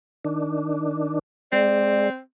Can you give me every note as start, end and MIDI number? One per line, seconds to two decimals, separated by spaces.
0.25 1.19 51
0.25 1.19 62
1.52 2.10 56
1.52 2.20 60
1.52 2.08 74